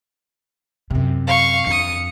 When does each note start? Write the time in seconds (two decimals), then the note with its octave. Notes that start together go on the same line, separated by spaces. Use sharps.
0.90 F#2 C3
1.27 F5 C#6
1.67 F2 D4 D#6 C#7